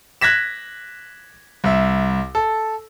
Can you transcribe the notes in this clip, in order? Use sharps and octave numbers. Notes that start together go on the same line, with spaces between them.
F#6 G#6 A#6 B6 E7
C2 E5
A4